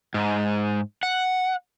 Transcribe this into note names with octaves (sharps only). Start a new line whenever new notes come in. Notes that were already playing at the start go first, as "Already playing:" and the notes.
G#2
F#5